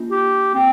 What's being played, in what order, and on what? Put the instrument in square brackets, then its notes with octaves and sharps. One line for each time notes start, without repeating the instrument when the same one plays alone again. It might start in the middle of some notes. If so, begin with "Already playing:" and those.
Already playing: [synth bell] A#3 D4 F4
[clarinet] G4
C4